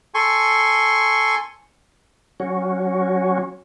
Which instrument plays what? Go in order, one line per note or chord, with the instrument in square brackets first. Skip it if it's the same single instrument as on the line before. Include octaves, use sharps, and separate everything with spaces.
[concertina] A4 G#5 C6 C#6
[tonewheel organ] F#3 C#4 F#4